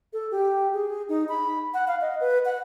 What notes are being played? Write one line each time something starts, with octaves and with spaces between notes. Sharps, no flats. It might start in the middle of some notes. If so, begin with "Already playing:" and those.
A4
G4
G#4
D#4
B5
F#5
F5
D#5
B4
F#5